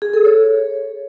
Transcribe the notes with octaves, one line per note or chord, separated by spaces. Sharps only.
G#4
A4
C#5